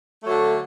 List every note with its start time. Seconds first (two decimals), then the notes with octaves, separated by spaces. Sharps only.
0.23 D3 F#3 A3